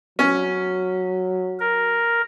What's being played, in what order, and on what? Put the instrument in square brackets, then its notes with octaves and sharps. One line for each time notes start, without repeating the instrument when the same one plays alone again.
[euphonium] F#3 [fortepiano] C#4
[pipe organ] A#4